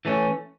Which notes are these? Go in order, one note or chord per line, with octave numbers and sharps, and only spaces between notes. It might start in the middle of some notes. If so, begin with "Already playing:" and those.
E3 A3 C#4